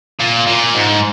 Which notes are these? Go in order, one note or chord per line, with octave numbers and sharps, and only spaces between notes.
A#2
A#2
G#2